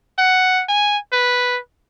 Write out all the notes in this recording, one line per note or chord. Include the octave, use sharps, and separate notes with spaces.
F#5
G#5
B4